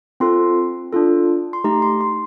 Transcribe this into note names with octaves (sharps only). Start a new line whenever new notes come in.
C4 F4 A4 C6
D4 F4 A4
C6
A3 D#4 G4 A#5
C6
C6